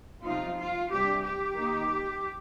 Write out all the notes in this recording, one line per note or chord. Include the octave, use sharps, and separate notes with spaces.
C3 F3 C4 D#4 F4
F4
C3 G3 D4 G4
G4
D#3 A#3 D#4